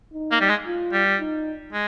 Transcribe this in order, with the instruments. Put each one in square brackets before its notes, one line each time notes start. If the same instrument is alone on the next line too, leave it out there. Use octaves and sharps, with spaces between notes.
[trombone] D#4
[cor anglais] A#3
G3
G#3
[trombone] F4
[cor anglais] G3
[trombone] D#4
[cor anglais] G#3